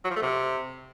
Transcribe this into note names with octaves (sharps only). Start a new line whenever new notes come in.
F#3
F3
A3
C3